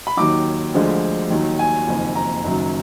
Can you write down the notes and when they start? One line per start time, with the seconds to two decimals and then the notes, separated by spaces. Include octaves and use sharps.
0.07 B5
0.17 D#2 D#3 F#3 D6
0.74 D2 D3 F3 G#3
1.30 D#2 D#3 F#3
1.59 G#5
1.87 F#1 F2 D#3
2.15 A#5
2.44 F#1 F#2 D#3 F#3